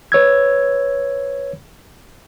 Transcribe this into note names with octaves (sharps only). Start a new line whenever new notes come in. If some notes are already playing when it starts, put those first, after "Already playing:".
B4 C#5 E6 G#6